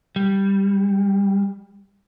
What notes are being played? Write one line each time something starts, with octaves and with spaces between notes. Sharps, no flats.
G3